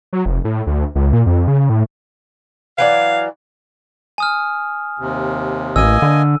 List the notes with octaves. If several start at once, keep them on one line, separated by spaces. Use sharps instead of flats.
F#3
F1
A2
D2
C#2
A#2
F2
C#3
A2
E3 F#3 D5 F5
G#5 D#6 F6
D#2 C3
A1 A#3 D#5 G#5 E6 D#7
D3